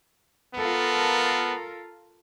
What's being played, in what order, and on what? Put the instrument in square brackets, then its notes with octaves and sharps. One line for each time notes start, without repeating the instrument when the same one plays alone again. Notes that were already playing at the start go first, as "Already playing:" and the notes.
[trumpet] B3 [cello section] F4 A4 A#4